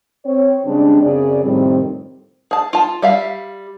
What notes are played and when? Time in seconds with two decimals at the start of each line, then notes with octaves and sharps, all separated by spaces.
0.25 C4 C#5
0.65 C#3 G3 G#3 C4 D4
1.02 F#2 C#3 C4 G#4 D5
1.43 F2 A2 C3 D#3 G3 C4
2.51 G#4 A5
2.73 F4 A5
3.02 G3 E5 F5